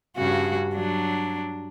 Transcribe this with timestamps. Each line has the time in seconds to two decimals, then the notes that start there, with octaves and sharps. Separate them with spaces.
0.17 G2 C#3 F#4
0.74 F#3 D4